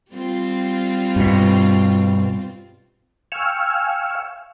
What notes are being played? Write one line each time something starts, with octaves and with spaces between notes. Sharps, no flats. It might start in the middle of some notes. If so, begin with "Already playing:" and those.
G3 C4 F4
G2 B2
F5 G5 G#5 C#6 E6 F6